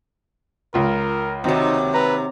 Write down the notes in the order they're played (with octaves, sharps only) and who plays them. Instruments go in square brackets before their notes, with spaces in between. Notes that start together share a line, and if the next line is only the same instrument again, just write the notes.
[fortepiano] C#2 F4 [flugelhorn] A#4
[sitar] D#2 C3 [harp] C4 F#4 C#5 [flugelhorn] D#4
[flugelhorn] B4 [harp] A#5